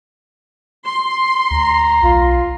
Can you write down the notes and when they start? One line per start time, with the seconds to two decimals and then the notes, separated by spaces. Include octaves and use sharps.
0.83 C6
1.51 D2 A#5
2.03 B1 F4